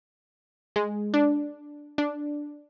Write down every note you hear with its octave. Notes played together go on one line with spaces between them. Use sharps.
G#3
D4
D4